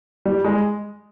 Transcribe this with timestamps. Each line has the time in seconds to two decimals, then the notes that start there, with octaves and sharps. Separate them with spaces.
0.25 G3
0.44 G#3